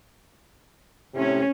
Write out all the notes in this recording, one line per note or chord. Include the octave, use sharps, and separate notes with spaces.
A2 C3 C#4